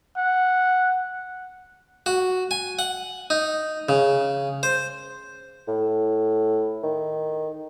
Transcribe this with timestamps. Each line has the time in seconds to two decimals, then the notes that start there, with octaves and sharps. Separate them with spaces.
0.17 F#5
2.06 F#4
2.51 G#5
2.79 F#5
3.30 D#4
3.89 C#3
4.63 C5
5.68 A2
6.83 D#3